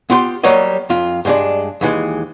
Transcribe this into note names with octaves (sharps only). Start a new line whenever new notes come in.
B3 F4 G4 C6
F#3 G3 A#3 C#5 D#5
F2 F4
G2 G#3 D4
D#2 E3 G#3